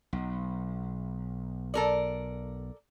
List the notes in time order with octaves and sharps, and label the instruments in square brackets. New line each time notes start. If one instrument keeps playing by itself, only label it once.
[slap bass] B1
[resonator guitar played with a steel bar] A4 A#4 D5